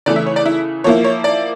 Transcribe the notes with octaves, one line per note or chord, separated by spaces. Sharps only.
C#3 E3 A3 D5
E4 E5
C#5
D5
E4 E5
F3 A#3 E4 C#5
C#5
D5